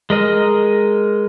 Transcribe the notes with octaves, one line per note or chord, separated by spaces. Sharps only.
G#3 A#4 D#5